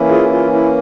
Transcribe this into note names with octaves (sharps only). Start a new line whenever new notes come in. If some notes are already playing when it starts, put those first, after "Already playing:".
Already playing: E3 A#3 C#4 E4
F4 G#4
F4
E4